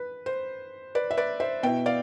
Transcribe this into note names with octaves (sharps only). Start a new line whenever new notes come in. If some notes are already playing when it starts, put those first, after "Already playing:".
Already playing: B4
C5
B4 D5
E5
B4 D5
C5 E5
B2 B3 E4 E5 G5
D5 F5